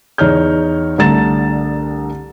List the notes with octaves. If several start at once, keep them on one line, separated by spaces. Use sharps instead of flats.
E2 D#4 C#5 F6 G6
C2 D3 A3 A#5 A6 E7